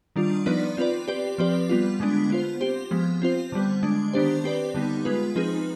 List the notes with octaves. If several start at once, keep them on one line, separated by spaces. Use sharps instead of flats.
D#3 G3 D4 F4
F3 B3 D#4 B4 D5
C4 F4 B4 D5
C4 G4 B4 D5
F3 C4 G4 B4 D5
G3 B3 F4
D3 G#3 B3 D4
B3 F4 C5
C4 G4 C5
F3 G#3 B3
C4 F4 C5
D3 G3 B3
D3 G#3 D4
D#3 B3 D4 G4 C5
C4 G4 B4 D5
D3 G3 B3 D#4
G#3 B3 F4 B4
F3 C4 D#4 G#4 B4